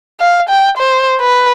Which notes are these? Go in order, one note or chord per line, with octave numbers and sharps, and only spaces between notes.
F5
G5
C5
B4